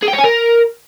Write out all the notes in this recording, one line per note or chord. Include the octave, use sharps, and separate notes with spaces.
G#4
G5
C#5
G#5
A#4